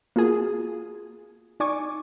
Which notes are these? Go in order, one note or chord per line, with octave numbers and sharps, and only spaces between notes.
A#3 F4 F#4 G#4
D#4 D5 G#5 C#6 D6